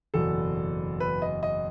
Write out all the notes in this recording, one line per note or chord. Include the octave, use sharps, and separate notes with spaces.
F#1 E2 B2 A4
B4
D#5
D#5